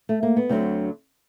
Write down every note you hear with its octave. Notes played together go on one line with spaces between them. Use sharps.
A3
A#3
B3
D2 D3 F#3 C4